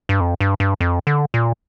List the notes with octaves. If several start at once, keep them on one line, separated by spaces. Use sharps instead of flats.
G2
F2
G2
G2
F2
D3
A#2